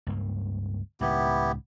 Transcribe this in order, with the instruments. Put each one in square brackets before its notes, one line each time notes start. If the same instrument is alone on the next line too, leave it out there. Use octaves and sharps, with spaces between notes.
[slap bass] C#2 G2 A#3
[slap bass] C#2 A2 D#3 [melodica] B3 E4 G4